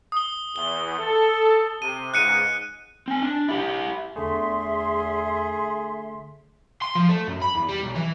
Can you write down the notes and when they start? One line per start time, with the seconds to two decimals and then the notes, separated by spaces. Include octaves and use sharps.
0.12 D#6 G7
0.56 E2 G7
0.99 A4
1.82 C3 D#7
2.14 C#2 G#2 F#6 C#7 D#7
3.08 C4 G#5
3.22 D4
3.49 E4 G4
4.16 E2 D3 A3 G#4 E5 C6
6.82 C6
6.95 F3
7.09 A3
7.27 F#2
7.42 B5
7.55 E2
7.68 G3
7.83 B1
7.95 E3